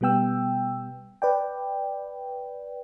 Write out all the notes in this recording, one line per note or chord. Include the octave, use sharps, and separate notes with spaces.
B2 G3 B3 G5 E6
B4 D5 G5